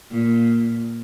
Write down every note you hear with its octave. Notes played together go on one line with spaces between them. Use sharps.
A#2